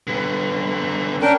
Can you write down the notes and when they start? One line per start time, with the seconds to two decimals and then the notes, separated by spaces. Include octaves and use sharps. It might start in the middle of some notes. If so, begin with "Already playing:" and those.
0.07 D3 B3
1.22 C#4 D4 A#4 G5